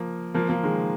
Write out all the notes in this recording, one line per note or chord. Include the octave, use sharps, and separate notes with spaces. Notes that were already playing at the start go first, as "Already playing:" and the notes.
Already playing: F3 A#3
F3 A#3
F3 A#3
D#3 G#3